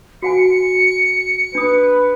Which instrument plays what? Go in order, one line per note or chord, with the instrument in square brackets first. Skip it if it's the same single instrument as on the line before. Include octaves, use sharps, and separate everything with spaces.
[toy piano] F#4 F#5 G#5 [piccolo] C#7
[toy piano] D4 D#6 [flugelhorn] B4